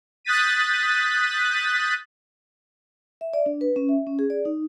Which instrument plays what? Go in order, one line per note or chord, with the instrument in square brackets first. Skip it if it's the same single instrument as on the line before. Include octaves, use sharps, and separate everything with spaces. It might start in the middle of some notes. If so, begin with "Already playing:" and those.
[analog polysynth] D#6 F#6 G6 A6 B6 D#7
[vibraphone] E5
D5
D4
B4
C#4
E5
C#4
G#4
D5
D#4